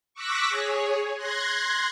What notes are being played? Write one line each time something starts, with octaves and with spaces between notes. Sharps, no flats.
C#6 D6 E6 F#6 A#6 B6
G#4 C#5
C6 F#6 G#6 A#6